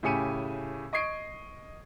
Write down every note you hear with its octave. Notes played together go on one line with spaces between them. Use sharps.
A2 C#3 G4 G#5 C#7 D#7
D#5 C#6 G#6 C7 D7